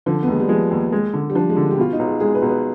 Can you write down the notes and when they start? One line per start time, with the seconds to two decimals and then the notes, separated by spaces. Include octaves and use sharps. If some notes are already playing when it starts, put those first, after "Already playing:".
0.06 D3 F3
0.23 B3
0.28 D#2 G#3
0.40 G3
0.49 F3 G#3
0.71 D#2
0.92 G#3
1.14 D3
1.30 G3
1.35 F3 D4
1.49 G#3
1.57 D3
1.71 G4
1.78 B2 F4
1.93 D#4
1.99 B1
2.06 G#4
2.20 G#3 G#4
2.35 B4
2.42 B1
2.49 B4